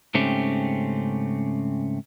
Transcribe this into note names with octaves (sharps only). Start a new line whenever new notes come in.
G#2 C#3 A3 C4 C#4 G4